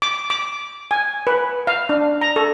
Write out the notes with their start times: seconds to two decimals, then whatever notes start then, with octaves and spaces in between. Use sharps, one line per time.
0.02 D6
0.30 D6
0.91 G#5
1.27 B4
1.67 F5
1.89 D4
2.21 A#5
2.36 A4